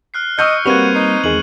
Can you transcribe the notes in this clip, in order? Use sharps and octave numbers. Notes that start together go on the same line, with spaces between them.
F6 F#6 C7
D#5 C#6 E6 F6 G6 C#7
G3 A#3 C4 F#4 B4 G#6 D#7 F7
D#4 C7
E2 D#3 G#3 F#7